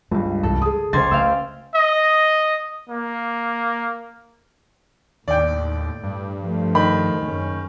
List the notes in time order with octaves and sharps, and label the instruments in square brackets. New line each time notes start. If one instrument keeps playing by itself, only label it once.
[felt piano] C#2 G2 [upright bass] C4
[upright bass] C2 E3 [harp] A4
[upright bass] C#3 [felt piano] G#4 D#6
[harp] C#2 C6 G#6 [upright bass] C#3 [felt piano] C5 A6
[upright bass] A3 [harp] F5 G5 E6
[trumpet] D#5
A#3
[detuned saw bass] D#2 [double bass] A2 [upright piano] D5 G5
[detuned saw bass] G2
[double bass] F3 A3
[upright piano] D#3 B5
[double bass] F#1 C#4